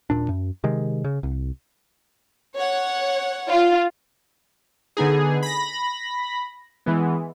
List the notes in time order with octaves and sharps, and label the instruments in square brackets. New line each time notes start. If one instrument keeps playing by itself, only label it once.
[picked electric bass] D#1 A#2 D4
F#2
C3 D#3 G#3
C#3
C2
[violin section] C#5 F#5
[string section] F4
[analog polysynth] D3 B3 D#4 G#4
B5 A#6
E3 G#3 B3